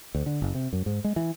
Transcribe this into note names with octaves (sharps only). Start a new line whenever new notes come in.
D2
D3
F#1
C3
F#2
G#2
G#3
E3